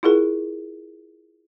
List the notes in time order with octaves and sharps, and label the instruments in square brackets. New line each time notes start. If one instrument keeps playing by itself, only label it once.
[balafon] E4 F4 G#4 A#4